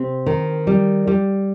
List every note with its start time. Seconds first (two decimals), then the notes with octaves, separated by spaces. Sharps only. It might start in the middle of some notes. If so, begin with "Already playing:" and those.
Already playing: C3 C4
0.26 D#3
0.67 G3
1.07 G3